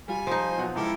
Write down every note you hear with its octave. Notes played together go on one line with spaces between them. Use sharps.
G3 F4 G#5
F3 D#4 C5
B2 F#3 F#5
C#2 E4 G4 A4 A#4